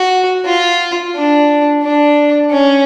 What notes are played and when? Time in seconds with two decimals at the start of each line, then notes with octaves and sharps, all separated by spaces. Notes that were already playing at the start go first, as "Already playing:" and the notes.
Already playing: F#4
0.46 F4
1.15 D4
1.83 D4
2.51 C#4